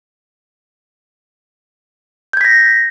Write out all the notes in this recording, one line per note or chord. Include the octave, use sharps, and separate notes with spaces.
G6 G#6 A#6 B6